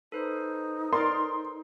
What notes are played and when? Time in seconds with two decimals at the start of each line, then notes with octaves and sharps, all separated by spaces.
0.12 D#4 A4 B4 C5
0.93 A#4 D5 C6